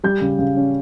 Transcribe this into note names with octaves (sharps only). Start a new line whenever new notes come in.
G3 G6
C#3
C#3
C#4